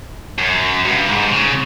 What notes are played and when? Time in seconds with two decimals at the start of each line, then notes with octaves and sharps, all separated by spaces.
0.39 F#2
0.86 G2
1.08 G#2
1.31 C#3